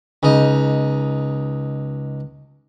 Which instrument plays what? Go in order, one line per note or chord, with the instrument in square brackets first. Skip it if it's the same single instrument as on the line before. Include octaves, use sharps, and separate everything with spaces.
[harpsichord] C#2 D#4